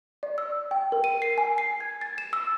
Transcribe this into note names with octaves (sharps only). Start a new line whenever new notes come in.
D5
E6
G5
A#4
D#7
C7
G#5
C7
G#6
A6
E7
E6